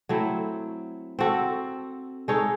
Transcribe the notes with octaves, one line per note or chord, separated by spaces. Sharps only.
F#3 A3 C4 E4
C4 F#4 A4
G#3 D#4 A4 C#5